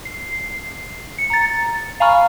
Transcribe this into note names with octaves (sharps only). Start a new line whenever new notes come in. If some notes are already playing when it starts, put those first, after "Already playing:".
C7
C#7
A#5 A6
F5 G#5 A#5 B5 C#6 F6